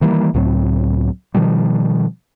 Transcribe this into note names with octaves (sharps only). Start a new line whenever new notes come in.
D#3 E3 G3 A#3
C#2 A2 F#3 C4
B2 D#3 F3 G3